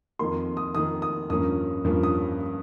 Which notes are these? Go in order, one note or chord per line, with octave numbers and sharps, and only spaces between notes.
F2 D#3 A#3 C6
D#6
F2 D#3 A#3 D#6
D#6
G2 F3 A#3 C#4 D#6
G2 F3 A#3 C#4
D#6